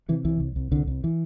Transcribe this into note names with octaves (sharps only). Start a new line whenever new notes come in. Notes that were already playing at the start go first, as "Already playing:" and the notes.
C3 E3
C2 E3
C2
C2
C2 D3
C2
E3